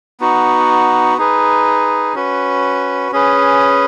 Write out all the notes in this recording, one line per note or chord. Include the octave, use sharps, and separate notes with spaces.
B3 D#4 F#4
D#4 G#4 B4
C#4 F#4 B4
C#4 G#4 B4